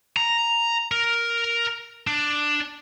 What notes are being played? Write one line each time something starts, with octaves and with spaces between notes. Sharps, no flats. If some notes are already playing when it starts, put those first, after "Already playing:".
A#5
A#4
D4